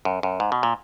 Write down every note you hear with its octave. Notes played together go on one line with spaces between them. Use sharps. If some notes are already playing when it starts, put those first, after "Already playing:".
F#2
F#2
G#2
B2
A#2